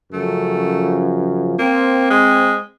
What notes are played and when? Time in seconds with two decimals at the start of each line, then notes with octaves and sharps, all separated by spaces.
0.13 F#2 C#3 F3 A3
1.59 A#3 C4
2.10 G#3